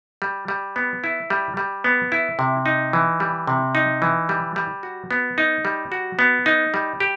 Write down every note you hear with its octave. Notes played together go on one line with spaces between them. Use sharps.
G3
G3
B3
E4
G3
G3
B3
E4
C3
D#4
E3
G3
C3
D#4
E3
G3
G3
F#4
B3
D#4
G3
F#4
B3
D#4
G3
G4